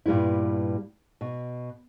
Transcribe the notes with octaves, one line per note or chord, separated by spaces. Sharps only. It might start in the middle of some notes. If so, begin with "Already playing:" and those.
G2 A#2 G3 B3 E4
B2